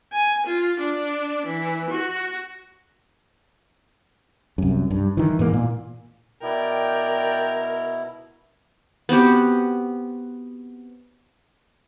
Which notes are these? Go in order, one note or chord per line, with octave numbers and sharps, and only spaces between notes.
G#5
F4
D4
E3
F#4
C2 F#2
G2
D#3 E3
G#2 E3 A#3
A#2
B2 E4 A#4 D5 G5
B3 C4 F#4 G4